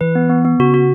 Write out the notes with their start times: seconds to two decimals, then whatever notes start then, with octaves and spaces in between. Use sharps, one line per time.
0.01 E3 B4
0.15 B3
0.30 B3
0.45 B3
0.59 C#3 F#4
0.74 F#4